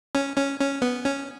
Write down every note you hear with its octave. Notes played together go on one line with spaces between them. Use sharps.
C#4
C#4
C#4
B3
C#4